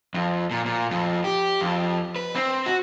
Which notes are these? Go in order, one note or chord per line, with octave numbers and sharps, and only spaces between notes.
F2
A#2
A#2
F2
G4
F2
B4
C4
F#4